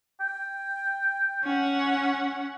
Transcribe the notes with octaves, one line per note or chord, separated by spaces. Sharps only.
G5
C#4 F#5